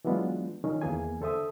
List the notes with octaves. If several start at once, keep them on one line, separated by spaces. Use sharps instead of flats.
E3 F#3 G#3 B3 D4 F4
D#3 F3 C#4
E2 E3 A#3 G#4 G#5
D3 A4 C5 E5 D#6